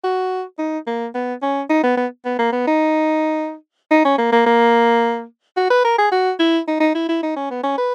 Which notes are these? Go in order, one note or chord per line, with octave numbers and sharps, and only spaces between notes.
F#4
D#4
A#3
B3
C#4
D#4
B3
B3
B3
A#3
B3
D#4
D#4
C#4
A#3
A#3
A#3
F#4
B4
A#4
G#4
F#4
E4
D#4
D#4
E4
E4
D#4
C#4
B3
C#4
B4